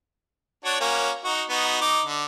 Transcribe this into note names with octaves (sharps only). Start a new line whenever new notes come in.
D4 F#4 C#5
A#3 C#4 F#4
D#4 F#4
B3 D#4 F#4
D#4 D6
D3